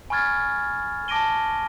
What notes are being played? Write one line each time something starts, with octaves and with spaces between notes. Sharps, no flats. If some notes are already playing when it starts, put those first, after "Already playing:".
G#5 B5 C#6 F6 G#6 A6
A5 D6 A#6 D7 D#7 G7